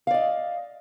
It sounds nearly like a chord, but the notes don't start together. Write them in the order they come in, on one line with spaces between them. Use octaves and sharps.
F5 D5 D#5